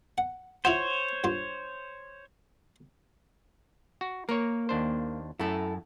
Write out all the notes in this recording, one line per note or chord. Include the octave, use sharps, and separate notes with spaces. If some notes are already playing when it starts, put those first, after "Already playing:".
F#5
E4 F4 C5 C#5 F#5
G2 F4
F#4
A#3 A#4 C#5
D#2 D4 C5
F#2 E4 A4